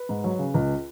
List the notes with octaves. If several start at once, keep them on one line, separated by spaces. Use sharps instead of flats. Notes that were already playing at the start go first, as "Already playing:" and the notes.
Already playing: B4
G#2
F#3
C#3
C#2